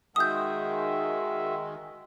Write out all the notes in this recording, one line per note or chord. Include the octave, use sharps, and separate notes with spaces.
D#3 G#3 F#4 G#4 E5 D#6 G6